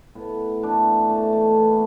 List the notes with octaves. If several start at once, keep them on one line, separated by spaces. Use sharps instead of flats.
A2 B3
E3 A3 D4
E3 A3
A3
E3 B3